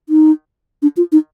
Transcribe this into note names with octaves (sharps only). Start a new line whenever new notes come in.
D#4
D4
F4
D#4